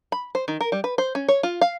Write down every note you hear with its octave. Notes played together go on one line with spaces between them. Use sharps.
B5
C5
D#3
A#4
G3
B4
C5
C#4
C#5
F4
F5